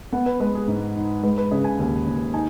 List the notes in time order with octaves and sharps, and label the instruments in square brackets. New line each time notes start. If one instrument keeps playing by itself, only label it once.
[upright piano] B3 F#5
B4
G#3 B4
G#4
G#2
D#4
G#3 B4
B4
C#3 G#4
G#5
D#2
D#2
D#4 G#5